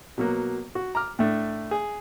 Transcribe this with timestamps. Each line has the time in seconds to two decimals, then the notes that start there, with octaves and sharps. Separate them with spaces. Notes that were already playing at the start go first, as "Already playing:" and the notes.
0.18 B2 F#3 A#3
0.75 F#4
0.95 A#5 D6 F6
1.19 A2 A3 D4
1.71 G#4